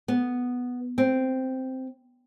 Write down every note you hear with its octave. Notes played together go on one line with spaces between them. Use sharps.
B3
C4